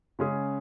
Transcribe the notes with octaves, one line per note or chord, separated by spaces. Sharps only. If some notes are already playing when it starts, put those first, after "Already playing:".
C#3 G#3 C#4 G#4